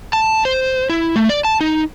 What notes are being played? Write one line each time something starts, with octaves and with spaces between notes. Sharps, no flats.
A5
C5
E4
A3
D5
A5
D#4